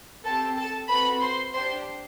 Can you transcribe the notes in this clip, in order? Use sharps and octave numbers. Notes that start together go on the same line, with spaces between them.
C4 G4 A4 A5
A4 A5
C4 F#4 A4 B4 B5
C5 C6
D4 G4 C5 C6